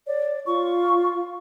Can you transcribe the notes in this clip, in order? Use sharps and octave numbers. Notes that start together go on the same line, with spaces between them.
C#5 D5
F4 C#6